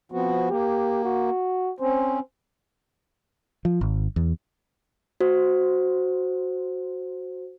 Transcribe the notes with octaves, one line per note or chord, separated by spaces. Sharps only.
F3 B3 C4 F#4
A#3 G4
F#4
C4 C#4 C5
F3
G#1
E2
F#4 C5